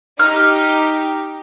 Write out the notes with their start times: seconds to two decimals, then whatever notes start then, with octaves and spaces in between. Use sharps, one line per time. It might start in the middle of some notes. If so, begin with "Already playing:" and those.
0.19 D#4 G4 F6